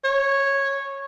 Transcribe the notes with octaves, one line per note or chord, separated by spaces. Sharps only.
C#5